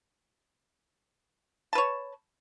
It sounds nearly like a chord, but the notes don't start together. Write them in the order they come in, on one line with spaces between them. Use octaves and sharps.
A5 B4 C#5